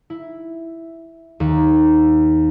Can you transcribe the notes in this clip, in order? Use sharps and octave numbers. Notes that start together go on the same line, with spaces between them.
E4
D#2